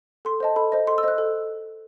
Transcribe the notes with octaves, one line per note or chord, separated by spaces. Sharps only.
A4 C6
C5 D#5 A5
A4 B5
C5 D#5
A4 C6
E6
C5 D#5 F#6
A4